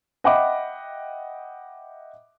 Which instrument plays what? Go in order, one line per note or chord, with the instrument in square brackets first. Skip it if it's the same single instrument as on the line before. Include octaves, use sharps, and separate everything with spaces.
[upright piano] D#5 E5 F#5 G5 B5 D6